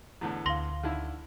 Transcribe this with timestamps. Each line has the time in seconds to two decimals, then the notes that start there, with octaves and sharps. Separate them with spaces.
0.21 E2 A2 D3
0.46 D2 F5 C6 A#6 G7
0.83 D3 D#3 E4